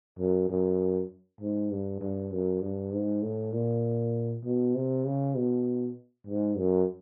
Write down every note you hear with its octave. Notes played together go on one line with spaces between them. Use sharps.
F#2
F#2
G#2
G2
G2
F#2
G2
G#2
A2
A#2
B2
C3
C#3
B2
G#2
F#2